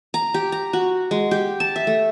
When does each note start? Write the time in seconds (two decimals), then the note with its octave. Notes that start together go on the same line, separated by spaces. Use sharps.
0.14 A#5
0.34 G4
0.52 A#5
0.73 F#4
1.11 G#3
1.31 G4
1.60 A5
1.76 E5
1.87 A3